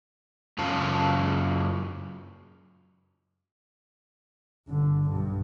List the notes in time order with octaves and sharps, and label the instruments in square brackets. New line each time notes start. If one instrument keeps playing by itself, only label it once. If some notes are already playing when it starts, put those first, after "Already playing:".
[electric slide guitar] F#2 C#3 F4 A5
[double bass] G1 D3
B1 G2